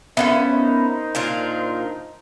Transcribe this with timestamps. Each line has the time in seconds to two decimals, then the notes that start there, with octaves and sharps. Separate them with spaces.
0.17 F#2 D3 B3 C#4 E4 E5 F5
0.52 D#4 A#4 C5
1.15 A#2 D4 F4